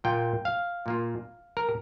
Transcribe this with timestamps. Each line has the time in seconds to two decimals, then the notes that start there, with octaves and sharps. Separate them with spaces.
0.04 A#2 A#3 F4 G5
0.45 F5
0.86 A#2 A#3 F4
1.57 A#4